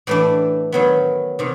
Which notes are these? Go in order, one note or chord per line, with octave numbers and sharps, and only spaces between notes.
A2 E3 A3 D4
D#3 F#3 B3
C3 D#3